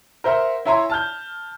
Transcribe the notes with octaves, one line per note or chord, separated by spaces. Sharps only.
A#4 C5 E5 F#5
E4 C#5 E5 G#5 A#5 C6
A5 F6 G6